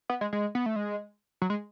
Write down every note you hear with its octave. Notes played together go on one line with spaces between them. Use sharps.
B3
G#3
G#3
B3
A3
G#3
F#3
G#3